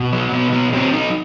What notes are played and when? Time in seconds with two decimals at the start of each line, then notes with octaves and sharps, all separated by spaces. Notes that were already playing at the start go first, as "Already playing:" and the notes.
Already playing: B2
0.12 F#3
0.32 B2 B3
0.53 F#3 B3
0.73 F#3 C4
0.93 F#3 D#4